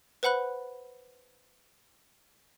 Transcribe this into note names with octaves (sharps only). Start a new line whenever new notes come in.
B4 C5 F#5 B5 F#6